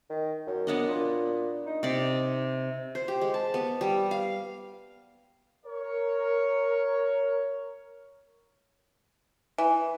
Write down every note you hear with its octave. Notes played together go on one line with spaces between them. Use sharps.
D#3
F#2
B3 D4 D#5
A#2
D#4
C3 D5
C5
G4
G#3
A5
B3
G3
F5
A#4 C#5
E3